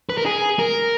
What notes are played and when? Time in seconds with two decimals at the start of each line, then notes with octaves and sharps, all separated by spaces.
0.09 B4
0.18 A#4
0.26 G#4
0.59 A#4